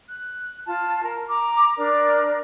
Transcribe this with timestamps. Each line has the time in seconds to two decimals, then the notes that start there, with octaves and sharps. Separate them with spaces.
0.09 F#6
0.67 F4 A5
1.03 A#4
1.28 A#5 D6
1.77 D4 A#4 D5